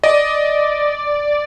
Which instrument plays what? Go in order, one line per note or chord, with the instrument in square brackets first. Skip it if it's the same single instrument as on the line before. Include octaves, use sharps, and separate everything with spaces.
[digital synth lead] D5 [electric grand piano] D#5